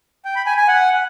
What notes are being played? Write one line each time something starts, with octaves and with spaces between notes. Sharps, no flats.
G5
B5
G#5
G#5
F#5